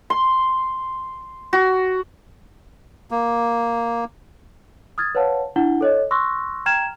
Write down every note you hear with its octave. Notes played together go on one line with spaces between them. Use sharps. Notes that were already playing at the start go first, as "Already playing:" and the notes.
C6
F#4
A#3
D#6 F6 G#6 A6
B4 C#5 F5 F#5 A5
D4 E4 F#5 G7
A4 C#5 D#5
C6 C#6 E6 F#6 A#6
G5 A#5 F6 G#6 E7 F7